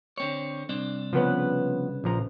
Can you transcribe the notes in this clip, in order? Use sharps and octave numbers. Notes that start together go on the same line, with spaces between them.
D3 C4 C#5
C2 C4 D4
C#3 F3 B3 C#4 B4
A#1 F3 A#5